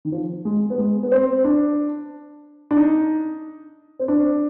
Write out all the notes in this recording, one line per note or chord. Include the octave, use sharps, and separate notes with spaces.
D#3
F3
G#3
B3
G#3
B3
C4
D4
D4
D#4
C4
D4